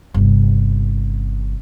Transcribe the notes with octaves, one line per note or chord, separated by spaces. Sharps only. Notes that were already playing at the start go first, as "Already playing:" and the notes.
G1 C3